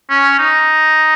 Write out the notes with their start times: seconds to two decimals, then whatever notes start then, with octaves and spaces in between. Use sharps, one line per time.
0.10 C#4
0.39 D#4